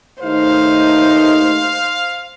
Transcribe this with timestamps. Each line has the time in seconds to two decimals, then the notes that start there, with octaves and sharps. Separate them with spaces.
0.23 D#2 A3 D#4 C5 F5